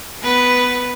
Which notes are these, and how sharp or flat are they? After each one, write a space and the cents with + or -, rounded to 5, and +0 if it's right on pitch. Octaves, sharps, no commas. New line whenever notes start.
B3 +10 B4 +0